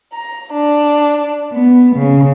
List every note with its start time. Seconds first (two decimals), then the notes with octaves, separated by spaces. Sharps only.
0.12 A#5
0.53 D4
1.52 B3
1.95 C#3